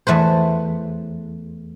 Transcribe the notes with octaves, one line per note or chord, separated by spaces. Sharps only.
E2 A3 B4 C5